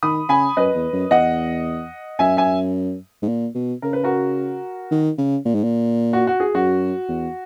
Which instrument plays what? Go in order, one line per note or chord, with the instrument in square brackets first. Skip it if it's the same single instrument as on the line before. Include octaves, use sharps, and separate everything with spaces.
[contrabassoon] D#3 [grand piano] B5 D#6
[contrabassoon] C#3 [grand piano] G#5 B5
[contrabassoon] F#2 [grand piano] B4 D#5
[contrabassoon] E2
F#2
[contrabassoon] E2 [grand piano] D#5 F#5
[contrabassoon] F#2 [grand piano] E5 G#5
[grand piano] E5 G#5
[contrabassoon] G#2
A#2
B2
[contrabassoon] C#3 [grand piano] A#4
[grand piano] B4
F#4 A#4
[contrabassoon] D#3
C#3
A#2
G#2
A#2
[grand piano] F#4
F#4
G#4
[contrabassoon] F#2 [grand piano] F#4
[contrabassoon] E2